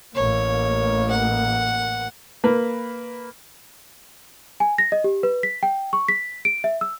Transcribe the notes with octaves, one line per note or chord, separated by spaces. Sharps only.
A1 A#3 C#5
F#5
A#3 B4
G#5
A#6
D#5
G4
B4
B6
G5
C#6
B6
D7
E5
E6